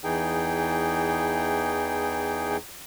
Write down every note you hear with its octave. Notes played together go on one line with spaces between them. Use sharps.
E2 E3 D#4 G#4 G5